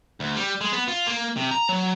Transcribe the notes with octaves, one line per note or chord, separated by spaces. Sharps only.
D2
G3
G#3
B3
F4
A#3
C3
A#5
F#3